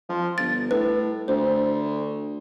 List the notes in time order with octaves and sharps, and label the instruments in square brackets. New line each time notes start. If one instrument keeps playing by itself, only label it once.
[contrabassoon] F3
[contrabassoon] G1 [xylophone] A6
[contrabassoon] A2 [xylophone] B4
[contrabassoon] D2 [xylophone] C5